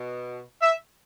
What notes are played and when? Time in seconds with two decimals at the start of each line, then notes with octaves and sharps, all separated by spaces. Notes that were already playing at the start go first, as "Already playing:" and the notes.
Already playing: B2
0.61 E5